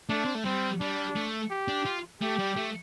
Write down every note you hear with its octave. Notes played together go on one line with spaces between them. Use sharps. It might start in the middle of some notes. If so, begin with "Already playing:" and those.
A3 D4
C4
A3
G3 C4
G3 D4
A3
G4
D4
F4
A3 G4
G3
A3